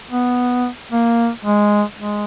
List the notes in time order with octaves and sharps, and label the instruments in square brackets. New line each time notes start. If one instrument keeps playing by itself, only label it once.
[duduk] B3
A#3
G#3
G#3